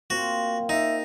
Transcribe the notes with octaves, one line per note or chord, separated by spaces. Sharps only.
A#3 C4 F4 F#4
D#4 E5